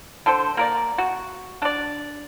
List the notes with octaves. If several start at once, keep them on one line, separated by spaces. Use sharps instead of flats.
D3 A4 C5
A#3 A#4 D5
F#4
D4 D5